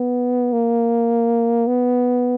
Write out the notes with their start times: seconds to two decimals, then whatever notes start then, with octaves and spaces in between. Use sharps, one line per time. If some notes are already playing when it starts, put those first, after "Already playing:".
Already playing: B3
0.52 A#3
1.67 B3